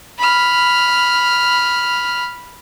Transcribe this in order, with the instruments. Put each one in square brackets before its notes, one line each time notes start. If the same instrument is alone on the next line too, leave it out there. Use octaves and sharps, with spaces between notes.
[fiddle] B5 F6